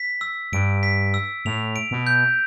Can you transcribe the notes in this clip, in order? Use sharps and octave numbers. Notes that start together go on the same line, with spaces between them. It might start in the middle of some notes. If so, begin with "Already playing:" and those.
Already playing: B6
E6
G2 D7
B6
E6
A2 F7
D7
B2
G6